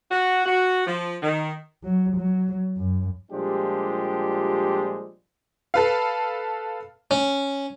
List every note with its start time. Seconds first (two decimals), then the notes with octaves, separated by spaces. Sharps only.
0.10 F#4
0.46 F#4
0.86 F3
1.22 D#3
1.83 F#3
2.16 F#3
2.77 F#2
3.32 A#2 F3 G3 G#3 D4 G4
5.74 A4 B4 F5
7.11 C#4